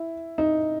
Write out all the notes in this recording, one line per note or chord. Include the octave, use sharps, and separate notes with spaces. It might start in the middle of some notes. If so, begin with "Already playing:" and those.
Already playing: E4
D#4